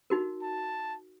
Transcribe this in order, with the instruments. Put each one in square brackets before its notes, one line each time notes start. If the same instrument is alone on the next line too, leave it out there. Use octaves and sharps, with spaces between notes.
[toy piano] D#4 F#4 A#4
[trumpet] A5